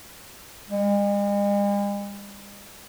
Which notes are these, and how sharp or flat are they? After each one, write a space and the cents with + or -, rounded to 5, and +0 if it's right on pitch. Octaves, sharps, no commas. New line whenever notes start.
G#3 -45